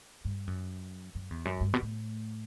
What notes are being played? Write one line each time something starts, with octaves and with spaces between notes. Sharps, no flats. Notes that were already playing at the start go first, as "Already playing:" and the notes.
G2
F#2
F#2
E2
F#2
G2
B2
A2